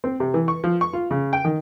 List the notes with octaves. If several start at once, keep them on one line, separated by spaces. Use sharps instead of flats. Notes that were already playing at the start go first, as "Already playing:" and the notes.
C4
C3
E3
C#6
F3
C#6
F4
C#3
G5
D#3